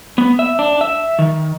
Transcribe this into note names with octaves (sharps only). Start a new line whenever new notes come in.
B3
E5
D4
E5
D#3